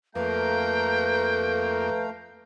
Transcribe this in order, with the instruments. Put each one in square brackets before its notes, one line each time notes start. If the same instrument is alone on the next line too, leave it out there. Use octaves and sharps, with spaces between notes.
[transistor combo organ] F2 A#3 [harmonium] A3 F5 A#5 [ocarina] B4 [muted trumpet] G5